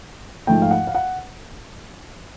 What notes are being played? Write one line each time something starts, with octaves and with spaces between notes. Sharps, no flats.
G#2 F3 A3 G5
F5
F#5
F5
F#5